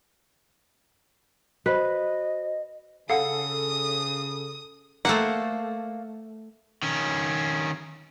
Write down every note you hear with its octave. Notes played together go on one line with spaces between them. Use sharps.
F#4 B4 C5 D#5
C#3 A4 F5 F#5 D#6
A3 A#3 C5 F#5
D#3 C#4